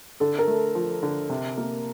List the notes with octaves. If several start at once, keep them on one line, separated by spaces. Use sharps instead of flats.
D3 A4
A#4
A3
F3
D3
C3
A#3